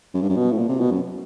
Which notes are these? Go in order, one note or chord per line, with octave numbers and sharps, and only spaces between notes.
F#2
G2
F#2
B2
A2
A#2
C3
B2
F#2